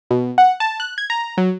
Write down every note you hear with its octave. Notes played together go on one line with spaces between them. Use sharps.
B2
F#5
A5
F#6
G#6
A#5
F#3